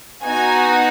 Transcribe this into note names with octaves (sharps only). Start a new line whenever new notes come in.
B3 D#4 F#4 G#5